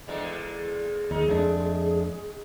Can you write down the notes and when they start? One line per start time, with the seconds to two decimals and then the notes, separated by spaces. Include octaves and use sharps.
0.08 E2 D3 G#3
1.11 D#2 D#4 G#4
1.28 F2 G#3 A3 D4